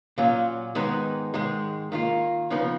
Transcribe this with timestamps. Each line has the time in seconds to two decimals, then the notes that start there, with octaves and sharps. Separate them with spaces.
0.18 A#2 F#3 C#4 F4
0.75 G#2 D#3 G#3 B3 D#4
1.34 G#2 D#3 G#3
1.92 D#3 A#3 F4
2.50 C#3 F3 B3 D#4